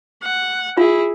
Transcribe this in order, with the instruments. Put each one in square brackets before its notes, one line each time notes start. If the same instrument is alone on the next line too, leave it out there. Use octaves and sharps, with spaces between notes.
[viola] F#5
[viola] E4 G#4 [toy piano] F4